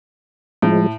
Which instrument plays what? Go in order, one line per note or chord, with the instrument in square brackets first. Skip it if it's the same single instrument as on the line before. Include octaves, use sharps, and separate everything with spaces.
[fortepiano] A2 [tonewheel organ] F3 G#3